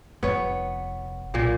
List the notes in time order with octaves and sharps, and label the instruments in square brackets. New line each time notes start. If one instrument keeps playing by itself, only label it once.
[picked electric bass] F1 [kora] B3 C#5
[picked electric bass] B1 [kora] A#2 A#3